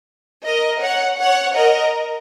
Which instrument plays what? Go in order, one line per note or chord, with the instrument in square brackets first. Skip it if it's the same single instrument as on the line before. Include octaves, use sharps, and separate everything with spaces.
[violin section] A#4 D#5
C#5 F#5
C#5 F#5
A#4 D#5